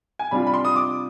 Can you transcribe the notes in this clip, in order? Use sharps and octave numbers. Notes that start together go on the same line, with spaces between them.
G#5
C3 G3 D4 F4 B5
B5
C6
D#6
D6